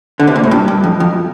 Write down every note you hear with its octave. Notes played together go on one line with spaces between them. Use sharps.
D3
C3
A#2
A2
G2
G2
F2
F2